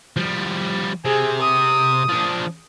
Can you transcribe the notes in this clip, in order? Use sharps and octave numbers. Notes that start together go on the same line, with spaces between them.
F3 G3
C3 G#4
D#6
F3 D4